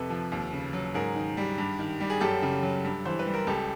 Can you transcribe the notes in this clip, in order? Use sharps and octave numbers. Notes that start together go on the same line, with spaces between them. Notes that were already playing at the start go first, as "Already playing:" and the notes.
Already playing: F2 C3 A4 B4
F3
D#2
C#3
F#3
G#2 G#4 A#4
D#3
G3
G2
D#3
G3
G#4
F#2 G4 A4
C#3
F#3
G2
E3 C5
B4
G3
A#4
C#2 G4 A4